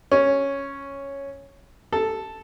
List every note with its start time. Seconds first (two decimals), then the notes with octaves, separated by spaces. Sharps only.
0.12 C#4
1.93 A4